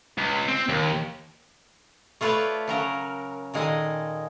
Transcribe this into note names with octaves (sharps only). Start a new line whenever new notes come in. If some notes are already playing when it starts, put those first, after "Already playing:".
C#2
C4
D#2
A3 F4 A4 B4 C#5 D5
C#3 F#3 A#4
A#2 D#3 G#3 A4 D#5